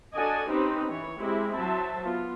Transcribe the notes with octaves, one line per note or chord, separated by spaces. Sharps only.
D4 F#4 A4 D5 D#5 G#5
C4 C#4 D#4 G4 B4 C5
E3 C#5
G#3 C4 E4 G4
F#3 C5 E5 A5
B3 F4